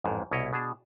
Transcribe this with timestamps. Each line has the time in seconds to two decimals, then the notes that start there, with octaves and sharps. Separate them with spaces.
0.04 A1 F2 G#2
0.31 C2 B2 E4 C#5 D#5
0.53 B2 D4 G#4 A5